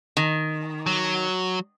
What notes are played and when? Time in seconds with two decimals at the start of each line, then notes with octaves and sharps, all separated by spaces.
0.17 D#3
0.87 F#3